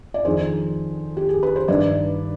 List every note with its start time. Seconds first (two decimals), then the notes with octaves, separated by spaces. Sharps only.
0.14 D5
0.25 F2 D#3 G#4 C5
1.17 G4
1.29 G#4
1.43 B4
1.56 C5
1.68 G2 D#3 B4 D5